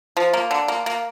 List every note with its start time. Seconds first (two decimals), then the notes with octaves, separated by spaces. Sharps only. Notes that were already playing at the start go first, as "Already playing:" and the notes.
0.17 F3
0.34 A#3
0.51 D3
0.68 A#3
0.86 A#3